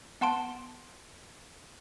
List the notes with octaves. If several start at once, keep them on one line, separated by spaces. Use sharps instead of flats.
B3 F#5 A5 C6 D7